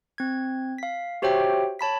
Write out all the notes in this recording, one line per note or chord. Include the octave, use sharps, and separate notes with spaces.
C4 G#6
F5 B6
F#4 G4 C5 C#5 E5 G5
C#5 A5 B5 B6